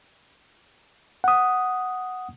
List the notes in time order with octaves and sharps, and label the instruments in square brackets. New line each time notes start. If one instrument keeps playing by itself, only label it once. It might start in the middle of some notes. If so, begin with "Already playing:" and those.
[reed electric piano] F#5 D#6